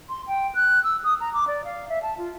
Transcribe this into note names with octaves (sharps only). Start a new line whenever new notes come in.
C6
G5
F#6
E6
D#6
A#5
D6
D5
F5
E5
A5
F4